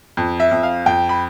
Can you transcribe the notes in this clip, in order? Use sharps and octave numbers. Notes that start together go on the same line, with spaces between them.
F2
E5
F2
F5
F2 G5
B5